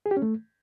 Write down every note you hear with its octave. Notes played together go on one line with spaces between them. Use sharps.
G#4
G4
C#4
A3